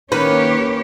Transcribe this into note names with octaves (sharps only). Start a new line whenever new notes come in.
D#3 A#3 C#4 G4 B4 C#5